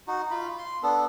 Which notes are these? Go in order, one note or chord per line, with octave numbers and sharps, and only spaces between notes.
D#4 F#4
F4 B5
C6
B3 D4 A4